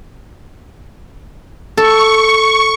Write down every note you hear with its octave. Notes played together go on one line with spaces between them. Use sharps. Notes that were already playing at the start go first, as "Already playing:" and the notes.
A4 C#6